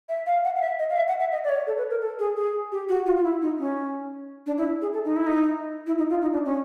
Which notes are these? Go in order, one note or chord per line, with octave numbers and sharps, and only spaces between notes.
E5
F5
F#5
F5
E5
D#5
F5
E5
F#5
E5
D#5
D5
C#5
A4
B4
A#4
A4
G#4
G#4
G4
F#4
F4
F4
E4
D#4
C#4
D4
E4
G#4
A4
D#4
E4
D#4
E4
D#4
F4
D#4
D4
C#4